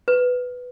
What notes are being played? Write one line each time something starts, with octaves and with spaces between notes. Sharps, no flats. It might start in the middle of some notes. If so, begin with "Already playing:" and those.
B4